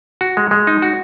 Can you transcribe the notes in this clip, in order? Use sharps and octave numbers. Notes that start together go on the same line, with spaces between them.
F#4
G#3
G#3
D#4
F#4